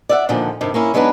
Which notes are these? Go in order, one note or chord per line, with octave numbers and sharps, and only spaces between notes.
D5 E5 F#5
A#2 D3 D#3 F3
G2 C3 D#3
A#3 C#4 E4
F#3 G#3 B3 D4 D#4 B4